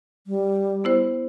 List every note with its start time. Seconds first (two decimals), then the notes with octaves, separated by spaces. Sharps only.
0.27 G3
0.84 B3 E4 C5